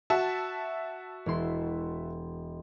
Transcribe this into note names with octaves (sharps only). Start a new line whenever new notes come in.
F#4 E5 A5
E1 E4 C6